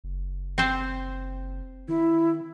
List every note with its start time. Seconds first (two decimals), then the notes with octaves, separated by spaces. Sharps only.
0.04 F#1
0.58 C4 C5
1.88 D#3 E4